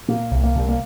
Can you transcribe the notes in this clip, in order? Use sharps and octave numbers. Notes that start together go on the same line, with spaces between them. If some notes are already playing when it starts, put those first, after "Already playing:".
A#2 A#3
C2
A#3
C2
A#3